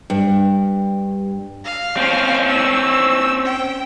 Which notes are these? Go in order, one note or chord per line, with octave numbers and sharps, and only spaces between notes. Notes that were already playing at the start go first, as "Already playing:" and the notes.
G2
F5
C4 C#4
E6
G5